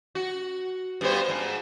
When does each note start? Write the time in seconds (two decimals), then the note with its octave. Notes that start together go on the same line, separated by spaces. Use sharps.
0.15 F#4
1.01 G2 B3 C5
1.29 G#2